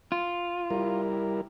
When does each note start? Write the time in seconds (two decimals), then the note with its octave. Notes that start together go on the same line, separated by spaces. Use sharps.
0.12 F4
0.70 G3 E4 A#4